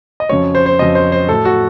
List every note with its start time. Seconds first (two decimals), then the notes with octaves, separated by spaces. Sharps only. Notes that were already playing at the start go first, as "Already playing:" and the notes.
0.20 D#5
0.29 F2 C#3 F#3 C#5
0.55 C5
0.66 C5
0.79 F2 C#3 F#3 D#5
0.95 C5
1.12 C5
1.28 A2 F#3 A4
1.45 F#4